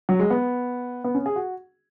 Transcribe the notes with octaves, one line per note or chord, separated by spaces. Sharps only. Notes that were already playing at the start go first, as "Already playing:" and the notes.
F#3
G#3
B3
B3
C#4
G#4
F#4